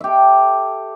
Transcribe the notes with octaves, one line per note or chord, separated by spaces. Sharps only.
G4 A4 E5